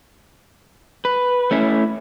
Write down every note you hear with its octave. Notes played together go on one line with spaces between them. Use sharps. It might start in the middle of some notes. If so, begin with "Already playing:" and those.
B4
A3 C#4 E4